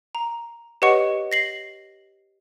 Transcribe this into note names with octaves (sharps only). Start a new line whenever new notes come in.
A#5
G4 B4 C#5 D#5 F#5 C#6
A#6 C7 F#7